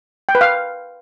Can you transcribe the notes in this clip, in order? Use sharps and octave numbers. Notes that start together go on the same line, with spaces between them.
G5
B4
F5